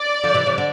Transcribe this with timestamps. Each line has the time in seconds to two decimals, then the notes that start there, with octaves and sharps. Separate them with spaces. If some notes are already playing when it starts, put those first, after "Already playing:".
Already playing: D5
0.23 D3 F3
0.34 C3 E3
0.46 C3 E3
0.58 D3